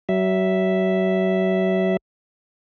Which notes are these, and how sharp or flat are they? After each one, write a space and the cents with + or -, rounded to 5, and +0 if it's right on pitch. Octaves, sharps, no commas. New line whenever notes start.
F#3 +30 E5 +0